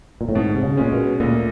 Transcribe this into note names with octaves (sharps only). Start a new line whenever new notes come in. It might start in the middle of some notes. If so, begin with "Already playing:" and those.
A#2
A2
G#2 B2
C3
C#3
A#2 G#3 C#4
B2
D2 A#2